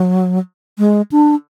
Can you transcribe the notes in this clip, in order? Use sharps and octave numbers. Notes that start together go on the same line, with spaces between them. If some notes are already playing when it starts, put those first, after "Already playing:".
Already playing: F#3
G#3
D4